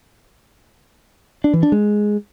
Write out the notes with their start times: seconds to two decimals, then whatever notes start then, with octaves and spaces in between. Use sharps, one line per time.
1.44 D4
1.53 E3
1.63 D4
1.72 G#3